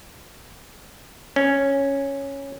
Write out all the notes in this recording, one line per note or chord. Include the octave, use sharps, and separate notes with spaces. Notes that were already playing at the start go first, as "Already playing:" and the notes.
C#4